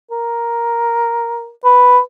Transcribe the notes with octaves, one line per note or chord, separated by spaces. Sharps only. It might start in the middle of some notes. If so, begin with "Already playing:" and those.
A#4
B4